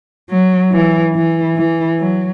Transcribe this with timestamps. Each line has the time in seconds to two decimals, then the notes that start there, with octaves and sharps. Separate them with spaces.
0.30 F#3
0.72 E3
1.15 E3
1.57 E3
2.00 F#3